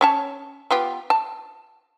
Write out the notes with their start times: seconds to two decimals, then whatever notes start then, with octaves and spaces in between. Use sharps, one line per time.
0.01 C#4 C#5 A5
0.71 B3 F4 G4
1.10 A5